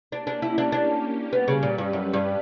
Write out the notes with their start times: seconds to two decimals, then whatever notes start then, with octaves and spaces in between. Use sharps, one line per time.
0.12 A#3 C#4 D4 G4
0.27 D4
0.42 E4
0.58 D4
0.72 D4
1.33 G3 B3 C#4 G4 B4
1.48 C#3
1.63 A#2
1.78 G2
1.93 F#2
2.14 G2